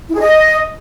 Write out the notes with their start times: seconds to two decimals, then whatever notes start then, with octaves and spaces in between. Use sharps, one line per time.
0.09 E4
0.14 G#4
0.19 D#5